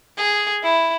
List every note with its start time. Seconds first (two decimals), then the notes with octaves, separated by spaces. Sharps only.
0.17 G#4
0.63 E4